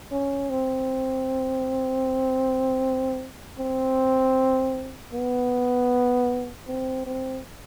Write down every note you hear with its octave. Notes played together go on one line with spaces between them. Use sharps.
C#4
C4
C4
B3
C4
C4